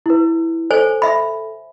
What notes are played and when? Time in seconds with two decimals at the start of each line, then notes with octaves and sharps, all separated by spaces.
0.06 E4 B4
0.71 A4 C5 C#5 G#5
1.02 E5 B5